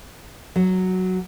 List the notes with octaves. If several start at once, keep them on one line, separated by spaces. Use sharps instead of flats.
F#3